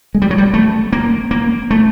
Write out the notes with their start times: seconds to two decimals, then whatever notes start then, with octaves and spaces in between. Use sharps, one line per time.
0.15 G#3
0.22 G3
0.31 F#3
0.38 G3
0.54 A3
0.93 A#3
1.31 A#3
1.71 A3